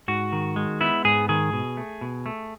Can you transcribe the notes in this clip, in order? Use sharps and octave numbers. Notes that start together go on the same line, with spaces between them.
G#2 F#4
D#3
G#3
B3 E4
G#2 G#4
D#3 G#4
B2
A3
B2
A3